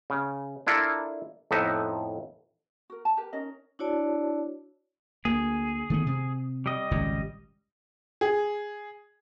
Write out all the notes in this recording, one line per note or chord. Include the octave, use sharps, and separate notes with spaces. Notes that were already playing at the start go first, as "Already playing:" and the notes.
C#3
D4 E4 F4 A4 A#4
F2 A2 B3 D#4 E5
F#4 A#4
A5
G4 A#4 B4
C#4 D#4 A#4 D#5
D4 E4 F#4 C#5 D5 A5
D2 A#3 G#4
D#3 A3 B3
C3
G3 D#5
G#1 C#2 A#2
G#4